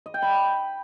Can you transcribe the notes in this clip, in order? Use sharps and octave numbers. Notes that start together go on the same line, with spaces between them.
D#5
G5
B5